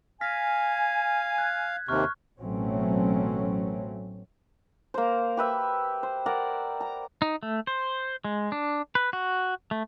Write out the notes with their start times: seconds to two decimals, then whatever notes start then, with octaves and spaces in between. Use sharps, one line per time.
0.21 F5 G#5 F6 A#6 B6
1.38 F#6 G#6
1.88 D#2 C3 C#6 F6 F#6
2.42 A1 B2 F#3 A3 C4 C#4
4.94 A#3 C5
5.37 G4 B4 E5
6.03 C5
6.26 A#4 D5 F#5
6.81 A#5
7.22 D#4
7.43 A3
7.67 C5
8.25 G#3
8.52 D4
8.95 B4
9.13 F#4
9.71 A3